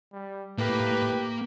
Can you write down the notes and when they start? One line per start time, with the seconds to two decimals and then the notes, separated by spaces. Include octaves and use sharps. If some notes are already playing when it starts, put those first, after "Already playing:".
0.13 G3
0.58 A2 A#3 G4 B4